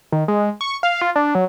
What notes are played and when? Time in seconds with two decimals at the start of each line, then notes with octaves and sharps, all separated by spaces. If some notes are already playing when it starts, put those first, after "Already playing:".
0.12 D#3
0.28 G#3
0.61 C#6
0.83 F5
1.01 F4
1.16 D4
1.35 F#3